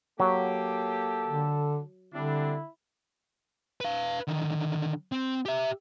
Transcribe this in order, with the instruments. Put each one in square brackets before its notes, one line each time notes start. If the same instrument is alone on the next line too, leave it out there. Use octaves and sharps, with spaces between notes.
[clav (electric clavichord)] F#3 [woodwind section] A#3 G4 [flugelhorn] A4
[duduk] D3
[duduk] D3 [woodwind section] G3 C4 D4 [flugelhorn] E4
[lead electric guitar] B4 F5
D3 D#3
C4
G4 E5